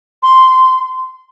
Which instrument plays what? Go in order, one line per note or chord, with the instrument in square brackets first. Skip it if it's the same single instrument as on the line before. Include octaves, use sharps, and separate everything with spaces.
[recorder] C6